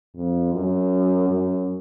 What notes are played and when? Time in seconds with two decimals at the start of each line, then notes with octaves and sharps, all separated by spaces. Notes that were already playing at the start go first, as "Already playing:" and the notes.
0.15 F2
0.53 F#2
1.30 F#2